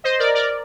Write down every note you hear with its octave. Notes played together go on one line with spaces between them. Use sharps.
C5 D#5
A#4 D5
A#4 D5